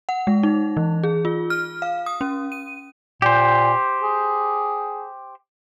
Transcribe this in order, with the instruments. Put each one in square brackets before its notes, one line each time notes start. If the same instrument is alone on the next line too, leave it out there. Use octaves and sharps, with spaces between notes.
[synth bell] F#5
G#3
D#4
E3
G#4
F4
F6
F5
D#6
C#4
D#7
[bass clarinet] A#2 [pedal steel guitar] G4 C5
[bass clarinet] G#4